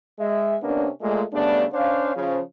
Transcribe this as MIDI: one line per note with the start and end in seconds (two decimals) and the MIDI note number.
0.20 0.56 56
0.20 0.56 76
0.62 0.89 48
0.62 0.89 58
0.62 0.89 59
0.62 0.89 61
0.62 0.89 62
1.02 1.23 46
1.02 1.23 56
1.02 1.23 57
1.33 1.66 49
1.33 1.66 55
1.33 1.66 57
1.33 1.66 59
1.33 1.66 62
1.73 2.11 61
1.73 2.11 62
1.73 2.11 72
1.73 2.11 73
1.73 2.11 77
2.16 2.40 49
2.16 2.40 53